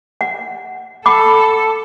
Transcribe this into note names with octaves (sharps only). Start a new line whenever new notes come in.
F#5
A4 F#5 B5 D6